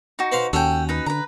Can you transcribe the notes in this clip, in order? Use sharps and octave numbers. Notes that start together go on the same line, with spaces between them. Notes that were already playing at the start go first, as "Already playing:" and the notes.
D#4 F#4
B4 C5 F5
D#2 C#4 F#4 A4 G5
D#4 B4
D3 B4 A#5